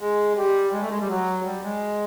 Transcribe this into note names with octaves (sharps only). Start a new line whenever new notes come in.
G#3
G3
G#3
A3
G#3
G3
F#3
G3
G#3